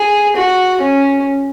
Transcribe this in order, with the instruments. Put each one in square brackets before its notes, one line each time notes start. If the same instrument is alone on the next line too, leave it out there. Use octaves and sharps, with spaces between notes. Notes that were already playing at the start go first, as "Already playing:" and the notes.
Already playing: [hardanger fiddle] G#4
F#4
C#4